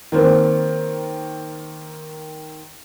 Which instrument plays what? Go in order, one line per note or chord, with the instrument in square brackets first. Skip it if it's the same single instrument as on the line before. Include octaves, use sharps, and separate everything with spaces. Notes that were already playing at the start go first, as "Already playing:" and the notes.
[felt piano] D#3 A#3 C4